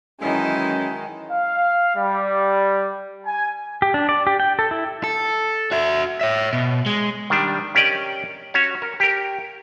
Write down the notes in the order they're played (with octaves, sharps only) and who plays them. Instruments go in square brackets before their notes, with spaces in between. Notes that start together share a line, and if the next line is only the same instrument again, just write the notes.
[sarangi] D#3 [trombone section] E3 F#3 C#4 [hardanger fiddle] G#3 [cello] D#4 E4
[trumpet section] F5
G3
G#5
[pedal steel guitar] G4
D4
D5
G4
G5
A4
E4
[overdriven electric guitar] A4
F#4 E5
C#5 E5
B2
G#3
[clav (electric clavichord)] D#3 G3 D4
C#4 G4 A#4 D5 D#5
C#4 F#4 C#5
A#4
G4 A#4